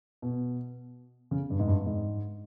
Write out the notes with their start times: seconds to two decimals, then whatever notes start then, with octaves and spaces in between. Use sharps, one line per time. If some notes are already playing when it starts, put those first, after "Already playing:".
0.22 B2
1.31 C#3
1.50 G2
1.59 G#2
1.68 G2
1.86 G#2